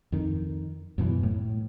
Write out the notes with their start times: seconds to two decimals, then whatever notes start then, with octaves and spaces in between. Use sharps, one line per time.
0.12 F2 D#3
0.98 F#2 B2 D#3 E3
1.23 A2